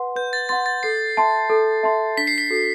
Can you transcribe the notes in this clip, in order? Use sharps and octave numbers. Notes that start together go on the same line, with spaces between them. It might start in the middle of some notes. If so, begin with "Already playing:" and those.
Already playing: B4 F#5 C6
B4 G6
A6
F#5 C6 A6
A6
A4 C7
E5 A5 C6
A4
E5 A5 C6
D4 B6
C7
B6
F#4 A4